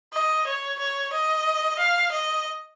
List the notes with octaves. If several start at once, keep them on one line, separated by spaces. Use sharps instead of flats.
D#5
C#5
C#5
D#5
F5
D#5